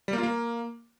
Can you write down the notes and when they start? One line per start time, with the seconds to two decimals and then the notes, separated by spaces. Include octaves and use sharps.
0.08 G3
0.13 A#3
0.18 F4
0.23 A#3